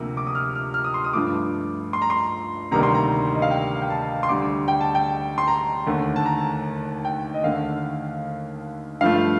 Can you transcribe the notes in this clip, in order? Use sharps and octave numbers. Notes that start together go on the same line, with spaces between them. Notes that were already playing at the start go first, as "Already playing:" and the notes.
Already playing: D2 C3 F3 A#3
D6
D#6
F6
F6
F6
D#6
C6
D#6
G2 F3 A3 D6
C6
A#5
C6
D2 C3 D#3 G3 A#3 A#5
C6
A#5
D#5
F5
G5
G5
A5
C6
D2 D3 G3 D6
G5
A5
G5
C6
A#5
D#2 D3 A3
A5
A#5
G5
D#5
D#2 D3 A3 F5
G2 F3 A3 F5